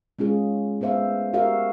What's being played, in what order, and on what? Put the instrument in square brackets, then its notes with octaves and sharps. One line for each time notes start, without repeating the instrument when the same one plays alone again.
[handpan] G#3 C#4 F4 G#4
A3 B3 C5 E5 F5
F#4 G4 A#4 E5 F5